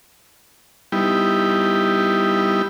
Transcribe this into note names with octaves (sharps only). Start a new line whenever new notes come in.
G3 B3 D#4 E4 G4